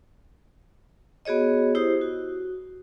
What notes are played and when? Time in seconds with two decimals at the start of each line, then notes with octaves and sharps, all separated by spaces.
1.25 B3 F#4 G#4 C#5 D#5
1.75 E4 G4 C5 D#6
2.01 F#4